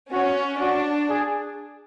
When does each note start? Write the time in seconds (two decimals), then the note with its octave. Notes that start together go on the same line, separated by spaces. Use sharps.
0.12 C#4 F#4
0.61 D4 F#4
1.09 G#4